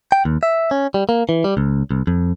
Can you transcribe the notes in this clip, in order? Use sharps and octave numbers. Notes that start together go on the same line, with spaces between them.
G5
D#2
E5
C#4
G3
A#3
E3
G3
C#2
C2
F2